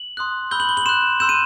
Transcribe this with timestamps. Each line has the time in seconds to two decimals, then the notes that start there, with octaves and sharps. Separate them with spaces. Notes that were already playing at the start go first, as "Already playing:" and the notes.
Already playing: F#7
0.17 C6 D#6 F#6
0.51 B5 E6 G6 G7
0.60 F#7
0.69 G7
0.77 F#7
0.86 C6 F#6 E7
1.20 C6 E6 G6 E7
1.29 D#7